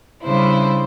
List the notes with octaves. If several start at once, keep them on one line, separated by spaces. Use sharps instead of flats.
C#3 G3 D4 E4 C5